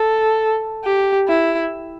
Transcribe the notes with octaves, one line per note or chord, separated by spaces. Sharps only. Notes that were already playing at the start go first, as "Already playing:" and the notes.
Already playing: A4
G4
E4